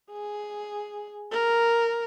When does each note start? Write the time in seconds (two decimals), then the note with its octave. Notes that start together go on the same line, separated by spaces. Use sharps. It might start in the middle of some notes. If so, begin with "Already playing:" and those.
0.11 G#4
1.31 A#4